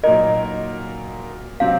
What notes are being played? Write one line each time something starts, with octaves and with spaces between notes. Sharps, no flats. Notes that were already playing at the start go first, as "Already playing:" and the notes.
A#2 F#3 A#3 D#4 A#4 D#5
C3 F#3 C4 F5